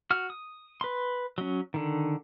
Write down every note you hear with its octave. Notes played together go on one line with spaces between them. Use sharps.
F#4 F6
D#6
B4 C6
F#3 C#4
D3 D#3